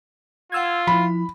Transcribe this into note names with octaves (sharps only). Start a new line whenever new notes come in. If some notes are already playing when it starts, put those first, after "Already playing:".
F4 F#5 E6 G#6
F3 E4 B5